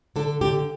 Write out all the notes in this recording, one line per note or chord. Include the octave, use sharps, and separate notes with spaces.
D3 A4
D3 G4